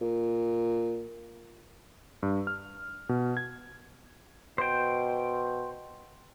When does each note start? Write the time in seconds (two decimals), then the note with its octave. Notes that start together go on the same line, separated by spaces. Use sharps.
0.01 A#2
2.23 G2
2.47 F6
3.09 B2
3.37 G#6
4.58 B2 C5 G5